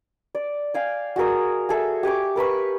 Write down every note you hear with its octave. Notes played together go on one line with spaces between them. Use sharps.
D5
F5 G5 G#5
F#4 G#4 A#4 D#6
G#4 A4 E5
G4 G#5 C#6 D6
A#4 B4 B5 C#6